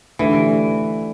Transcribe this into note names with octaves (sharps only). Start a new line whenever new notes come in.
D3 E3 A3 D4 G4